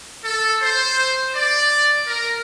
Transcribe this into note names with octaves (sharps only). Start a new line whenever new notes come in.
A4
C5
D5
A#4